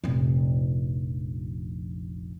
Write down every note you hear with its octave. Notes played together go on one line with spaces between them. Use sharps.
F1 A#1